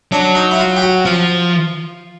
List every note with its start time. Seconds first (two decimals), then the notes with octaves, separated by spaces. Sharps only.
0.12 F#3 D4
0.35 D#4
0.51 E4
0.59 F4
0.77 G4
0.82 F#4
1.05 F3 F4